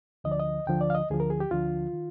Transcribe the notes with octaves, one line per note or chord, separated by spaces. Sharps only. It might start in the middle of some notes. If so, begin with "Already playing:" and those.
D2 D3 F3 D#5
D5
D#5
D2 D3 F3 G5
D5
F5
D#5
D2 D3 F3 G#4
A#4
G#4
G4
D2 D3 F3 F4
D#3